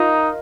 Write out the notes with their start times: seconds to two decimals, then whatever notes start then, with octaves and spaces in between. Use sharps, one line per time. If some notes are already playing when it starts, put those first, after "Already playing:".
Already playing: D#4 F4 A#4 D#5